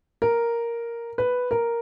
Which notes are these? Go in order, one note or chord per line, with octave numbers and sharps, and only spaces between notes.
A#4
B4
A#4